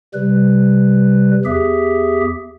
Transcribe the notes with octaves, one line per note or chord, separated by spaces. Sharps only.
C3 G3 B4
E2 G4 G#4 E5